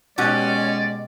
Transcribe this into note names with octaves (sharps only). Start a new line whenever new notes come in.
B2 G#3 C#4 F#4 G4 D5